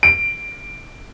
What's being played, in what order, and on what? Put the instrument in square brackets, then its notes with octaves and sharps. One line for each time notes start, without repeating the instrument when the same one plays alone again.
[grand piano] D7